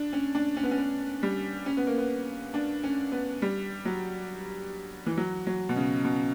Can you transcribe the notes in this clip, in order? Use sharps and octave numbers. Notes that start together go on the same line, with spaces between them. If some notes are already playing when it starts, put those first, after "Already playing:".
Already playing: D4
C#4
D4
C#4
B3
C#4
B3
G3
C#4
B3
A#3
B3
D4
C#4
B3
G3
F#3
E3
F#3
F#3
B2
C#3
B2